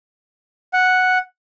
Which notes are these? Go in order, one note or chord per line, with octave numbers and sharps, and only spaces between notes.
F#5